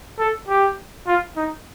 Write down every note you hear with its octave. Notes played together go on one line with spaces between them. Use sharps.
A4
G4
F4
D#4